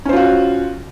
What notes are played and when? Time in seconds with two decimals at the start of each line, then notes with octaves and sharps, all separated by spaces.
0.05 C#4
0.09 C5
0.13 F4
0.16 F#4